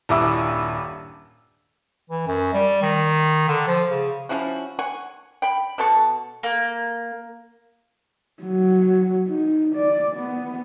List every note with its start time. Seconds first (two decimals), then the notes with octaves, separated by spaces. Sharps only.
0.09 D#1 G2 E4 D6 E6
2.10 E3
2.27 F#2
2.54 G3
2.82 D#3
3.48 D3
3.68 F3
3.89 C#3
4.29 F3 C#4 E4 F#4
4.79 F#5 G#5 C#6
5.42 G5 B5
5.78 B2 A4 A5 C#6
6.43 A#3
8.43 F#3
9.29 D#4
9.75 D5
10.16 B3